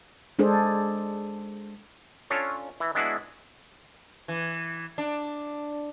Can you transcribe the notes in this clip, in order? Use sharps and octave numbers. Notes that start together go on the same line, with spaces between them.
G#3 D4 G#4 A4 C5
C#4 D4 F4 A4 C#5
E3
G#3 B3 D4 E4 F#4 G#4
E3
D4